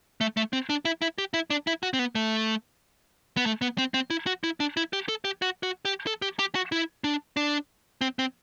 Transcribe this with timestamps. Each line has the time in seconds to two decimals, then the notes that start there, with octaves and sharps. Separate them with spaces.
0.21 A3
0.37 A3
0.53 C4
0.70 D4
0.85 E4
1.02 E4
1.18 G4
1.34 E4
1.50 D4
1.67 E4
1.83 F#4
1.93 C4
1.99 B3
2.15 A3
3.37 B3
3.46 A3
3.62 B3
3.78 C4
3.94 C4
4.10 E4
4.27 F#4
4.44 E4
4.60 D4
4.77 E4
4.93 G4
5.09 A4
5.25 G4
5.42 F#4
5.63 F#4
5.85 G4
6.07 A4
6.22 G4
6.39 G4
6.55 F#4
6.72 E4
7.04 D4
7.37 D4
8.01 C4
8.19 C4